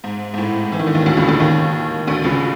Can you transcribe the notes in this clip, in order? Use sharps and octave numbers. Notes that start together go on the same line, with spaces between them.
G#2
G#2
A2
E3
D#3
D3
D#2 D#3
D2 D3
C#2 C#3
D2 D3
D#2 D#3
D2 D3
C#2 C#3